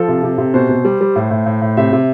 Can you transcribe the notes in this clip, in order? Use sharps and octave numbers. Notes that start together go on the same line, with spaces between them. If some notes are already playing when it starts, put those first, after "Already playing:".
Already playing: F3 A4
C3
C3
C3
B2 C5
B2
G3
G3
A2
A2
A2
A2
C3 E5
C3